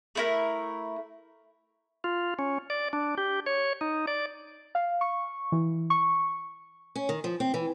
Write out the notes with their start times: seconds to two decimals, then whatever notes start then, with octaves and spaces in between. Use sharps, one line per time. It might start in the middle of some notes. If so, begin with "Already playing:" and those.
0.15 A3 E4 A#4
2.04 F4
2.39 C#4
2.70 D5
2.93 D4
3.18 G4
3.46 C#5
3.81 D#4
4.07 D5
4.75 F5
5.01 C#6
5.52 E3
5.90 C#6
6.96 C#4
7.09 D#3
7.24 F3
7.40 C4
7.54 E3